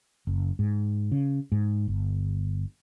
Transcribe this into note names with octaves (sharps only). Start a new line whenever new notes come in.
F#1
G#2
C#3
G#2
G1